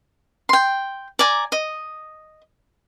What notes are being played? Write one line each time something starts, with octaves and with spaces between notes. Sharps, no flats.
G5 C6
D5 G#5 A#5
D#5